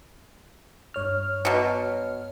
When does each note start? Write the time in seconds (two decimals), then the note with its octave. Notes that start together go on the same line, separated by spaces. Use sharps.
0.94 G2 C#5 F6
1.45 B2 F#3